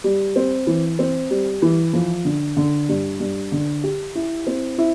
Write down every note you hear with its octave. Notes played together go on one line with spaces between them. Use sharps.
G3
C4
E3
C4
G3
E3
F3
D3
D3
G2
G2
D3
G4
E4
C4
E4